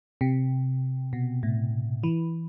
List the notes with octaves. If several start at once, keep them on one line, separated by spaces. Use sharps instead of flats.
C3
B2
A2
E3